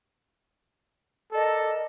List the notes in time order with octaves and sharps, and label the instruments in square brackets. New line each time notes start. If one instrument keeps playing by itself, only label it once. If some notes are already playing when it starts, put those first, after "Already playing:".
[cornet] A4 [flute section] A#4 D5 D#5